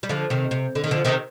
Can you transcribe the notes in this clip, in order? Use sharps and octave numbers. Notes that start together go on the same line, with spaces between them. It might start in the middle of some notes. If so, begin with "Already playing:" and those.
G3
D3 F3
C3 D#3
C3
D3
D#3
D3 F3
C3 D#3